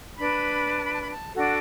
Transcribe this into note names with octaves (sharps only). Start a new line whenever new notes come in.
D4 B4 B5
A5
B5
A5
B5
A5
D4 F#4 A4 F#5